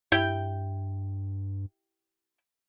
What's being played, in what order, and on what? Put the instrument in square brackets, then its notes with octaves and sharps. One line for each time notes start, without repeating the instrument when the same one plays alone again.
[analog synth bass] G2 [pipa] E4 G4 G5